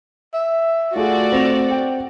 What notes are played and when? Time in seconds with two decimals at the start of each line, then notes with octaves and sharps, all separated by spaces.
0.34 E5
0.96 A3 F4 F#4 G#4 D5
1.32 C4 A#6 E7 F7
1.70 G5